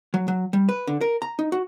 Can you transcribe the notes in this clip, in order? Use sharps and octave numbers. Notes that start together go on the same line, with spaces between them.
F#3
F#3
G3
B4
D3
A#4
A#5
D#4
F#4